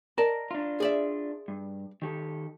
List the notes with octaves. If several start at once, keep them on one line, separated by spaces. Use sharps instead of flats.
A#4 D5 D#5 A5
D4 F4
G#4 D5 E5
G2
D#3 G4 A4